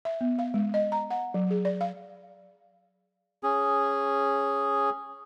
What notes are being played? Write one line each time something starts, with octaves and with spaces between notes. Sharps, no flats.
E5
B3
F5
G#3
D#5
A#5
F#5
F#3
G#4
D5
F5
C#4 G#4